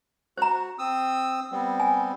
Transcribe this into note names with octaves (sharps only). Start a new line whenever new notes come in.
F#4 C5 A#5
C4 D#6 E6
G3 B3 C4
G#5